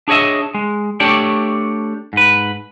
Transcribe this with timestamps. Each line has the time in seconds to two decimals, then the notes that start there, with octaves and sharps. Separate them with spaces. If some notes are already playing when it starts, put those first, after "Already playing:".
0.08 D4 G#4 C#5 D#5 E5
0.54 G#3
1.00 A3 D4 G4 C#5 D5
2.13 G#2 B4